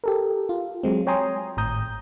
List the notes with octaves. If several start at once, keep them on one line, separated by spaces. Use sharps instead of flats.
G4 A4 A#4
F4
F#3 G#3 C4
C#5 G5 G#5 A#5 C6 D#6
G#1 A2 A#5 D#6 G6